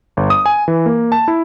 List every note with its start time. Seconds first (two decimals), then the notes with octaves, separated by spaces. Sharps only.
0.17 G1
0.30 D#6
0.46 G#5
0.68 E3
0.86 A#3
1.12 A5
1.28 E4